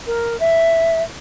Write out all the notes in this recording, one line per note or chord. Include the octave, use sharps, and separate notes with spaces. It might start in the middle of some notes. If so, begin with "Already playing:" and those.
A#4
E5